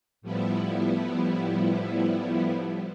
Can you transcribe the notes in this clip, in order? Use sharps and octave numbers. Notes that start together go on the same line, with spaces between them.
A2 F3 G3 B3 E4